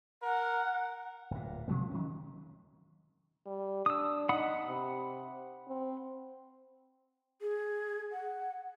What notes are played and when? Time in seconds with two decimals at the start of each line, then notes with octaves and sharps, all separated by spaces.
0.23 A#4 F#5
1.31 D1 A#2
1.68 B2 F3 G#3 A3
1.90 D#3 F#3 C#4
3.46 G3
3.86 D4 D#6 E6
4.29 D#4 F#5 B5 D#6
4.66 C3
5.68 C4
7.41 G#4
8.12 F#5